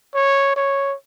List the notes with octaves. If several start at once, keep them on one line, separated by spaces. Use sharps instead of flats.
C#5
C#5